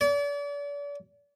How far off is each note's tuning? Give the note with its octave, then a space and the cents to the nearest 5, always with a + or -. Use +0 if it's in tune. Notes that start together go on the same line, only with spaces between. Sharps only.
D5 -40